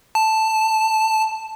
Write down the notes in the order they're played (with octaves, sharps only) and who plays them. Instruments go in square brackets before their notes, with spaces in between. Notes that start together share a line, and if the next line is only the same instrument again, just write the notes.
[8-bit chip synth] A5